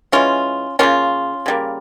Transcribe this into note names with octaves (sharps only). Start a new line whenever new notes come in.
E3 G#3 C#4 F4
C#3 G3 A#3 C#4 F4
C#3 G3 A#3